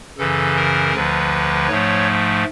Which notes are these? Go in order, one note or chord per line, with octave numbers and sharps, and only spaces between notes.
F#2 C#3 E3 A4
A#4
D2 D3 F3 B4
G#2 F3 A3 C#5